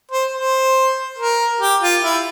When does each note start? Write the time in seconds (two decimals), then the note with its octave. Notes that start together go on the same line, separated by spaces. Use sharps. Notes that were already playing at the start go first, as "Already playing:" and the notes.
0.11 C5
0.33 C5
1.18 A#4
1.61 G4
1.82 F4
2.03 E4